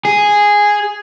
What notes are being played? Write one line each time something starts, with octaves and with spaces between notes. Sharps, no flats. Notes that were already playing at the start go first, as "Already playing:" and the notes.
G#4